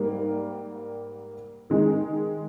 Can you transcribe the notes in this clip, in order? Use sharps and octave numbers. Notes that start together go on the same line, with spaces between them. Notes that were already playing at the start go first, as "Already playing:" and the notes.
Already playing: G#2 G3 A#3
D#3 G#3 D#4